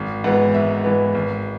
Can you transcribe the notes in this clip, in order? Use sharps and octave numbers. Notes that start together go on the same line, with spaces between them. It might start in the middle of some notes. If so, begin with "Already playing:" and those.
Already playing: G#1
G#2 E3 B3 F#5
G#1 E5
G#2 E3 B3
G#1